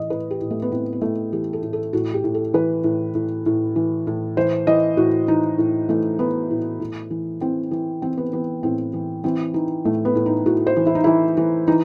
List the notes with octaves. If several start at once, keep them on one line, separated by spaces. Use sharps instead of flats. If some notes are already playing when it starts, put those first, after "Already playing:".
Already playing: A2 E3 D#5
A2 B4
G4
A2
A3
B3
A2 C4
B3
A2 A3
E3 G4
A4
A2
A4
A2 F#4
G4
A2
A4
E3 B4
A2
A2
A2
E3
A2
E3 C5
E3 D#5
A2 F#4
E3 D#4
A2
E3 A3
E3 B3
A2
A2
E3
E3 C4
E3
E3 C4
B3
E3 B3
A2 C4
E3
E3 C4
E3 D#4
A2 A3
B3
A2
D#4
A2 F#4
C5
E3
E4
D#4
E3 E4
E3
E3 D#4